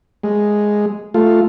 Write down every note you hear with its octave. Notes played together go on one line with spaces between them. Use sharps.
G#3
A3 F4